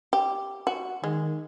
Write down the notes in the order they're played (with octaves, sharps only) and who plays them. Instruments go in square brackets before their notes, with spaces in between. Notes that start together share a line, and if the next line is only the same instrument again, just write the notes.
[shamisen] G4
F#4
[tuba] D#3 [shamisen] G#3